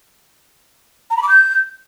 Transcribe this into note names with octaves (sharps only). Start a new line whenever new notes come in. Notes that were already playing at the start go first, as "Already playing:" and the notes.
A#5
B5
D6
G6